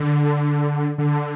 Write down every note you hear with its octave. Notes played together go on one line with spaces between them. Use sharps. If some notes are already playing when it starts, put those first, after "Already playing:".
Already playing: D3
D3